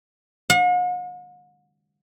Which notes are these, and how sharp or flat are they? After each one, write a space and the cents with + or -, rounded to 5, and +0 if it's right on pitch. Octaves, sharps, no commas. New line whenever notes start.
F#5 -45